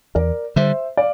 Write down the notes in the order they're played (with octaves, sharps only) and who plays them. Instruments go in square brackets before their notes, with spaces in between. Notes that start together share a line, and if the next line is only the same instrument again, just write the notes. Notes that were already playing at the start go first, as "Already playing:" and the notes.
[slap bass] E2 [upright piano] A#4 D5
[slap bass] D3 G3 [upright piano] C5 E5
[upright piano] D5 F5